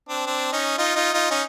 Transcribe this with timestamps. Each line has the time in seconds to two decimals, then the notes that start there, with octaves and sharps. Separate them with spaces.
0.09 C4 D4
0.27 C4 D4
0.52 C#4 D#4
0.78 D#4 F4
0.96 D#4 F4
1.13 D#4 F4
1.31 C#4 D#4